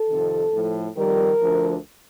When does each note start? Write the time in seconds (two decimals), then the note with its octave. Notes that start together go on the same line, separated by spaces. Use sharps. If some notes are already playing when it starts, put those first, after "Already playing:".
Already playing: A4
0.09 F2 C3 D#3
0.54 A2 F3
0.97 F2 D#3 G3 A#4
1.41 D2 D3 F3